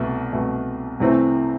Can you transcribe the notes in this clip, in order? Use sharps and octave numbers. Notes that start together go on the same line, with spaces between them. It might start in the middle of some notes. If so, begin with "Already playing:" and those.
Already playing: C2 B2 A3
C2 B2 A3
C2 C3 E3 A3 C4